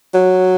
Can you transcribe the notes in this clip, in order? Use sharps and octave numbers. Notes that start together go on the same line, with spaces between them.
F#3